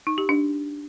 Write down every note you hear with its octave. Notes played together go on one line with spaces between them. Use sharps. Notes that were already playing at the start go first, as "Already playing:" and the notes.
D#4
G4
D4